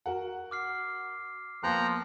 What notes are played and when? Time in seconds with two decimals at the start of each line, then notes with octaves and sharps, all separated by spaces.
0.06 F#4 A#4 F#5
0.51 D6 F6 C7
1.63 F3 A#3 B3 G5 A#5 F#6